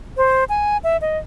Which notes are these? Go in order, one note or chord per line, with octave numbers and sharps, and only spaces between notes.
C5
G#5
E5
D#5